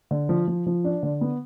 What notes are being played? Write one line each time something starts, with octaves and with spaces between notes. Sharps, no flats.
D3
F3
F3
F3
D4
D3
B3